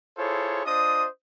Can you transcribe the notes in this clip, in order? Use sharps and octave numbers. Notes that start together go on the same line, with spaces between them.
E4 F4 G#4 A4 C5 C#5
D4 F4 C5 D#5 D#6